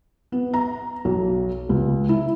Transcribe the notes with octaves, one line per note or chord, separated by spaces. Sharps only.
B3
A#5
B1
C#2
E4